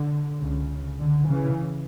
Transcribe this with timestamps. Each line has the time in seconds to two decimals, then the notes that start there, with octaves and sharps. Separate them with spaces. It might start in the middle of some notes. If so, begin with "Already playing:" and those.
Already playing: D3
0.39 C#2 C#3
1.00 D3
1.28 C#3 E3